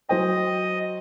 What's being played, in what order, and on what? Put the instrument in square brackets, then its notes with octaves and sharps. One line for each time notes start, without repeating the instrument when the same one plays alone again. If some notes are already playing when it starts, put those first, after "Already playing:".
[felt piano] F#3 C5 G5 [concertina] D#5